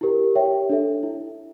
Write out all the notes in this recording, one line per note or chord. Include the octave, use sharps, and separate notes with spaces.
E4 G4 A#4
G4 C#5 E5 G5
D4 A4 E5
E4